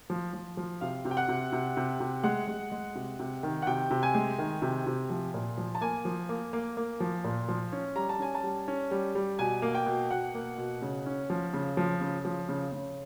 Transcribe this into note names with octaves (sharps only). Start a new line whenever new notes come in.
F3
F3
F3
C3 F5
C3
G5
F#5
C3
C3
C3
C3
G#3 F#5
G#3
G#3
C3
C3
D#3
F#5
C3 G5
C3
G#5
G#3
D#3
C3
C3
F3
A#2
F3
A5
A#3 G#5
F3
A#3
A#3
A#3
F3
A#2
F3
C#4
G3 A#5
A5
C#4 G#5
A5
G3
C#4
G3
G3
B2 G#5
A#3
G5
B2
B2 F#5
A#3
B2
C#3
C#4
F3
C#3
F3
C#3
F3
C#3
C#3